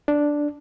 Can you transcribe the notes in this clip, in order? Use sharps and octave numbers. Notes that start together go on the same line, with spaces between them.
D4